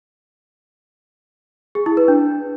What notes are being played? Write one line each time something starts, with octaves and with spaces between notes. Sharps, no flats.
G#4
E4
B4
D4